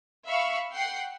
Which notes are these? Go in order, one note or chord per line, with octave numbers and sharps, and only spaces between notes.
E5 F5 B5 C#6
F#5 G5 C7